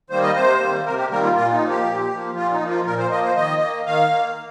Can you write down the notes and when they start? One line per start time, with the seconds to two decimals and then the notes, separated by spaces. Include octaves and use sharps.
0.10 D#3 G3 A#3 C5
0.23 D#5
0.35 C3 C5
0.60 D#3 G3 A#3
0.85 C3 A#4
0.97 G4
1.10 D#3 G3 A#3 A#4
1.23 F4
1.36 A#2 F4
1.52 D#4
1.60 F3 A#3
1.69 G4
1.86 A#2
2.11 F3 A#3
2.35 A#2 F4
2.53 D#4
2.61 F3 A#3
2.69 F4
2.86 A#2 A#4
2.98 C5
3.11 F3 A#3 D#5
3.24 C5
3.36 D#3 D#5
3.61 A#3
3.86 D#3 F5
4.11 A#3